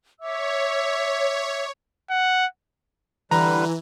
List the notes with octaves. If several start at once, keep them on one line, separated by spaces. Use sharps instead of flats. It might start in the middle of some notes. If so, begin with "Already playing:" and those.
C#5 E5 D6 E6
F#5
D3 E3 G3 B4 A#5